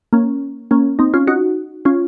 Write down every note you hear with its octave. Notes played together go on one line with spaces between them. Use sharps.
A#3 C#4
A#3 C#4
C4 D#4
C#4 F4
D#4 F#4
C#4 F4